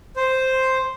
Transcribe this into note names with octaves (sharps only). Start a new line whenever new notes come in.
C5